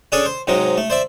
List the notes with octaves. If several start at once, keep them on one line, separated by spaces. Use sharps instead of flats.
C#4 D4 G#4 A4 C#5 D5
C5
G#2 C3 F#3 G#3
A3
C5 D5 E5